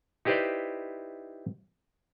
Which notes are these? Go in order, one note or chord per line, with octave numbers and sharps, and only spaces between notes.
D#4 E4 G4 B4 C5 D5